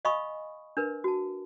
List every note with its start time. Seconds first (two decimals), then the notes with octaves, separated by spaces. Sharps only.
0.05 D#5 F5 G#5 B5 C#6 D#6
0.77 D4 A#4 B4
1.04 F#4 A5